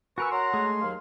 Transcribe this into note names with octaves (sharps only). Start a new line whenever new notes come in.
F#4 A#4 B4 G#5 C#6 E6
C#5 F#5 A#5 C6
G#3 A3 G#4
D#2 F#3 F5